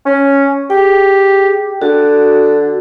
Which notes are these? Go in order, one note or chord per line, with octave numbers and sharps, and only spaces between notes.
C#4
G4 G#4 G5
D3 F#4